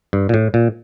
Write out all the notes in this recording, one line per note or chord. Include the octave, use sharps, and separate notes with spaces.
G2
A#2
A2
A#2